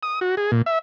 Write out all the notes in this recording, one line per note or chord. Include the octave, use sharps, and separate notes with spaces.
D#6
F#4
G#4
A#2
E5